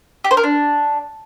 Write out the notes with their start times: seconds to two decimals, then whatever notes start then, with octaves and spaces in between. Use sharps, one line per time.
0.24 G4
0.31 C5
0.37 A#4
0.43 D4